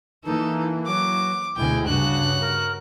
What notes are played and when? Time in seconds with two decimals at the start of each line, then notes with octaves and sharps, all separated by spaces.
0.25 E3 A#3 D#4 A4
0.86 F#3 D6
1.57 D2 B2 G#3 E4 G5 G#5
1.86 G2 C#3 D4 F#4 F#6
2.40 A#4